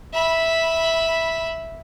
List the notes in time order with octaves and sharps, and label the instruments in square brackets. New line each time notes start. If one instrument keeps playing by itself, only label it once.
[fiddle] E5 B5